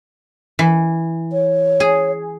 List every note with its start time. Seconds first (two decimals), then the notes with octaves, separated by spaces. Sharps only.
0.59 E3
1.33 C#5
1.80 G#4